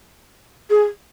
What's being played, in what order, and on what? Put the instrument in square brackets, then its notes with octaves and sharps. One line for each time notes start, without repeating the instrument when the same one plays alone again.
[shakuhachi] G#4